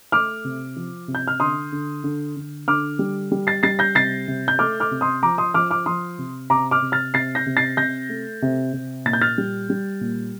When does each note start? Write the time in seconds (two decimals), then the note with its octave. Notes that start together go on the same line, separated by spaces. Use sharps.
0.12 A3 D6 F6
0.44 C3
0.76 F3
1.08 C3
1.15 G6
1.28 F6
1.40 D3 C6 D#6
1.72 D3
2.04 D3
2.36 D3
2.67 D3 D6 F6
2.99 G3
3.32 G3
3.47 A6 C7
3.63 G3 A6 C7
3.79 G6 A#6
3.95 C3 A6 C7
4.28 C3
4.48 G6
4.59 A3 D6 F6
4.80 D6 F6
4.91 C3
5.01 C6 D#6
5.23 F3 A#5 D6
5.38 C6 D#6
5.54 F3 D6 F6
5.71 D6 F6
5.86 F3 C6 D#6
6.18 C3
6.50 C3 A#5 D6
6.71 D6 F6
6.82 C3
6.92 F6 A6
7.14 C3 A6 C7
7.35 G6 A#6
7.46 C3
7.57 A6 C7
7.77 C3 G6 A#6
8.09 A3
8.42 C3
8.73 C3
9.06 A#2 A6
9.13 G6
9.22 F6 A6
9.38 G3
9.70 G3
10.01 A#2